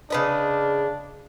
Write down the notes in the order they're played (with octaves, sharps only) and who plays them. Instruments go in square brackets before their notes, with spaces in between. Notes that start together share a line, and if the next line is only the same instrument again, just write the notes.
[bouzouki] C#3 B4 D#5 [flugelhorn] D4